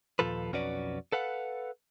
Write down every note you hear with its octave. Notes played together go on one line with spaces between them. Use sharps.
D#2 A#2 F3 F4 A4 B4
B1 F2 C#4 F#4 B4 D5
A4 B4 F5 F#5